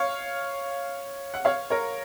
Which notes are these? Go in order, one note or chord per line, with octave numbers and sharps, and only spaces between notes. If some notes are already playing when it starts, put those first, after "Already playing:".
Already playing: C#5 F5
F#5
C#5 F5
A#4 C#5